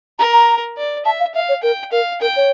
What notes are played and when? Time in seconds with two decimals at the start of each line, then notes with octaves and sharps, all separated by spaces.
0.19 A#4 A#5
0.33 A#5
0.77 D5
1.05 E5 A5
1.20 F5
1.35 E5 F5
1.49 C#5
1.63 A#4 G5
1.92 A#4 F5
2.21 A#4 G5
2.36 C#5